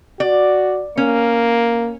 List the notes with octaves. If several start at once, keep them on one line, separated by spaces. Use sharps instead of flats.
F#4 D5
A#3 C#4